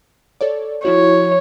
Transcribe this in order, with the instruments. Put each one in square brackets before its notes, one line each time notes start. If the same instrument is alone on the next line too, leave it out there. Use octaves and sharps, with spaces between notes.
[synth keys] A4 C#5 D5
[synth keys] F3 E4 F#4 [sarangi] C#5